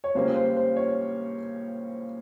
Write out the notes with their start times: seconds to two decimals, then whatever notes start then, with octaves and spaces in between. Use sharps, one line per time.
0.04 C#5
0.15 C#2 C#3 G3 A#3 C#4 C5
0.35 C5
0.56 C5
0.76 C#5